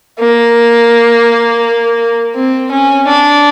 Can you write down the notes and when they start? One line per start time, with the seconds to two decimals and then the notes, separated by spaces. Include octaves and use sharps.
0.19 A#3
2.35 C4
2.71 C#4
3.07 D4